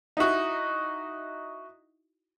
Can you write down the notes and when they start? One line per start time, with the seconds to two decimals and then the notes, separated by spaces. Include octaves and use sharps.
0.17 D#4 E4 F#4